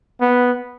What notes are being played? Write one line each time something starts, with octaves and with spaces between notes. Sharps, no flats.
B3